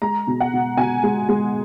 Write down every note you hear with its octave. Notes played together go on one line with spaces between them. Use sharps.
G#3 A#5
B2
F#5
B2
B2 G#5
G#3
G#3